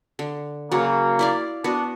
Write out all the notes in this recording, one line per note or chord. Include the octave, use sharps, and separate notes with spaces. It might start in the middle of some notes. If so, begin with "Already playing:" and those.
D3
C#3 F#3 A#3
E4 D5 F5
B3 D4 F#4